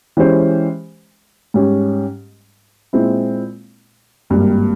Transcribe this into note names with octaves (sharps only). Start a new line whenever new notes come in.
E3 G#3 C#4 G4 C5
G#2 G3 C#4 G4
A#2 G#3 C4 E4
G#1 G2 G3 A#3